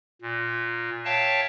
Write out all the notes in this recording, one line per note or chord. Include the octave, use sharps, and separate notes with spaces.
A#2
C#5 E5 F5 G5 A5